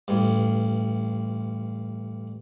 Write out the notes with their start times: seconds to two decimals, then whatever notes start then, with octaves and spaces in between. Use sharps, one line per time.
0.08 A1 G2